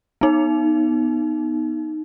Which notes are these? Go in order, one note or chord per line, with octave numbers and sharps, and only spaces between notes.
B3 D#4